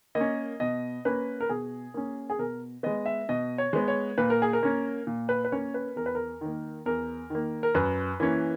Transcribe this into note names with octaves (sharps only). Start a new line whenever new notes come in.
A#3 D#5
C#4
B2 D#5
A#3 C#4 B4
A#4
B2 G#4
A#3 C#4
G#4
B2 A#4
G#3 B3 D#5
E5
B2 D#5
C#5
G#3 B3
C#5
A#2 B4
A#4
G#4
A#4
A#3 C#4
A#2
B4
B4
A#3 C#4 C#5
B4
E2 A#4
B4
A#4
D#3 A#3
E2 A#4
D#3 A#3
A#4
F#2 B4
E3 A#3 C#4